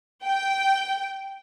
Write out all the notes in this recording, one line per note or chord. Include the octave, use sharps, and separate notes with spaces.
G5